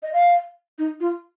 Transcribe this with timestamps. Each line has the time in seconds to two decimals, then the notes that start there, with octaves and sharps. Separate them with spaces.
0.03 D#5
0.13 F5
0.79 D#4
1.00 F4